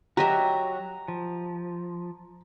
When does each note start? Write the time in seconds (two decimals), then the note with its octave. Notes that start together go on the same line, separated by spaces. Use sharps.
0.17 F#3 F#4 G4 D#5 E5 A#5
1.08 F3